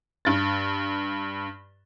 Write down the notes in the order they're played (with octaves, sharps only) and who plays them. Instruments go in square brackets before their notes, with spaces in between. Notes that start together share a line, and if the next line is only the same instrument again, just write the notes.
[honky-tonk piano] G2 A6